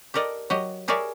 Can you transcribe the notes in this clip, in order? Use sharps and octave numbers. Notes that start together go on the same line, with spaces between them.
G4 A4 A#4 D5 D#5
F#3 G4 D#5
G4 G#4 A#4 C#5 D5 E5